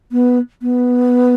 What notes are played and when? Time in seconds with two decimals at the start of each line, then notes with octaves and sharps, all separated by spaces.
0.12 B3
0.62 B3